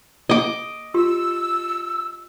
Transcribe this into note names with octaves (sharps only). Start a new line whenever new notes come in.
D#5 D6
F4 G4 C6 E6